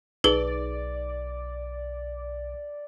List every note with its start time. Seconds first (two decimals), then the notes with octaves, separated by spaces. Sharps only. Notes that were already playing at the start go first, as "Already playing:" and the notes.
0.24 B1 D#4 G#4 B4 D5 G7